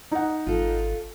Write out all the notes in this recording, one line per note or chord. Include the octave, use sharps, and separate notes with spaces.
D#4 F#5
G#1 F4 A4